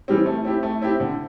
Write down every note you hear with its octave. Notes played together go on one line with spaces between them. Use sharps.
E3 G3 C4
A3
C4 E4 G4
A3
C4 E4 G4
D3